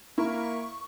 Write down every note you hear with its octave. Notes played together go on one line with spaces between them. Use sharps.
A#3 E4 A#4 C#6